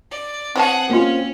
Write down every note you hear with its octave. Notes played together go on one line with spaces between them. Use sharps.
D5
E3 C4 G#4 C#5 F#5 A5
A#3 C#4 F4